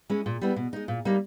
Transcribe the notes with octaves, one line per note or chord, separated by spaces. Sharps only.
G#3 C#4 E4
A#2
G3 B3 E4
B2
G#3 D#4
A#2
G3 A#3 D#4